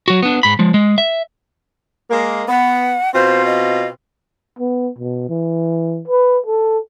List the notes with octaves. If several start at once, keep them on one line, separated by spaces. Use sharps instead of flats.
F#3 F#4
B3 D4
G#2 B5
F3 G#3
G#3
E5
G#3 A#3
B3 F#5
B2 C4 F4 C5
D#5
B3
B2
E3
B4
A4